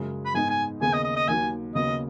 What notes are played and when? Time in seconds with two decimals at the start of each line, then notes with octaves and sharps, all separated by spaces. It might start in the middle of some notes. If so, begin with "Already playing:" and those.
Already playing: F#2 C#3 G#3
0.25 B5
0.34 G#2 G#3 B3 D#4 G#5
0.50 G#5
0.81 D#2 C#3 B3 G#4 G#5
0.93 D#5
1.04 D#5
1.16 D#5
1.28 D#2 D#3 F#3 G#5
1.75 D#2 C#3 F#3 B3 D#5